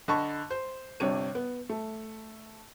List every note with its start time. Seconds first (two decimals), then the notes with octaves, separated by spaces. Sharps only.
0.08 D3 D#5 A5 B5 C#6
0.50 C5
1.00 G1 C3 D4 C#5 D#7
1.35 B3
1.69 A3